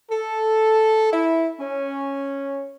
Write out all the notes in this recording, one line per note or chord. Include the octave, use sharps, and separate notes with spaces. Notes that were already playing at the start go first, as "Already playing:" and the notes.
A4
E4
C#4